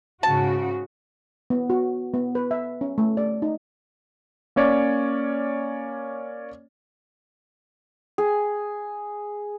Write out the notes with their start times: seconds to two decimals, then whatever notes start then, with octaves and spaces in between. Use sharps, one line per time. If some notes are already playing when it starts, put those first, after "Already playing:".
0.23 G#2 C#3 F#4 A5
1.50 B3
1.70 F#4
2.14 B3
2.35 B4
2.51 E5
2.81 C#4
2.98 A3
3.17 D5
3.42 D#4
4.56 A#3 C#4 C#5 D5
8.18 G#4